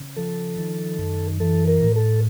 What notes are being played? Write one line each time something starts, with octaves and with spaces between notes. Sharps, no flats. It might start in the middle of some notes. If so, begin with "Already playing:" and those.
Already playing: C#3
F3 A4
D#3
F#2
E3 A4
A#4
A2
A4